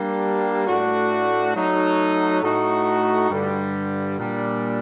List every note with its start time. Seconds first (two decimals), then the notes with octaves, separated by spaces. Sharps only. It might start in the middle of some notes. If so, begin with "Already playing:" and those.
Already playing: G3 A#3 D4
0.66 A2 A3 D4 F#4
1.55 F#3 A3 D#4
2.43 A2 A3 D#4 F#4
3.30 G2 D3 G3
4.19 A#2 G3 D4